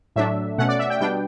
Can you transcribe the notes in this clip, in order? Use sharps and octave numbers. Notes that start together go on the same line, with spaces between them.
A2 F#3 A3 D4 E5
B2 A3 C#4 F#5
D5
E5
G5
B2 G3 B3 D4 G5